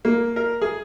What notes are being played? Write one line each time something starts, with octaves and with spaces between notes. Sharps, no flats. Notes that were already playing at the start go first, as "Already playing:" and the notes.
A#3
A#4
G#4